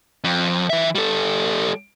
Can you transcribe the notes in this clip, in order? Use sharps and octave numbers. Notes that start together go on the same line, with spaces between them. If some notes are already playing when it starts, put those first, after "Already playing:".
F2
E3 E5
G3 A4